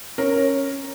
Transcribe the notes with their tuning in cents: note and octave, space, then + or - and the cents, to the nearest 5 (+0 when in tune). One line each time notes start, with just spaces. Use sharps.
C#4 -10 A#4 +0